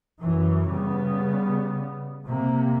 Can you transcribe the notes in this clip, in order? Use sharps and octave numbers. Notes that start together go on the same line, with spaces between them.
F#2 E3
C#3 G3 B3
C3 A#3